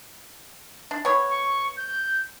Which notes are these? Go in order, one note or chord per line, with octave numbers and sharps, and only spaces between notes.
D4
B3 C#5
C#6
G6